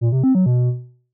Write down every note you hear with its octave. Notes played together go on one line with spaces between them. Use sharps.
A#2
C3
C4
F#3
B2